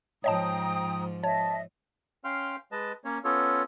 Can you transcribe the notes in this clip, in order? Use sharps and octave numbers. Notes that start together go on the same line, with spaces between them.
G#2 F3 C#5 D#5 G5 A5 A#5 D#6
C#5 D#5 E5 A5
C#4 F5 G5 C6 F6
G#3 B4 D#5 A5
A#3 C#4 C#5
B3 C#4 F4 A4 C#5